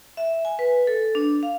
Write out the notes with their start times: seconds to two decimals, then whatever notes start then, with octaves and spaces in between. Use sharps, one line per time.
0.17 E5
0.45 G#5
0.59 B4
0.87 A4
1.15 D4
1.43 F5